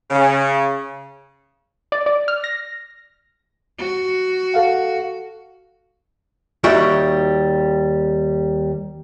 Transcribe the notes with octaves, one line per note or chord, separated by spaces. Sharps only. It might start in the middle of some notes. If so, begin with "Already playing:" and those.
C#3
D5
D5
F6
A#6
F#4
A4 F5 F#5
D#2 G3 D#4 F#4 E5 G5